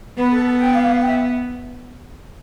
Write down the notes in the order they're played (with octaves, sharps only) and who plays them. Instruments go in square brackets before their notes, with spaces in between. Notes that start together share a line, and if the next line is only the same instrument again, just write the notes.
[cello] B3 [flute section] B4
[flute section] A4
A4
G5
F5
F5
G5
E5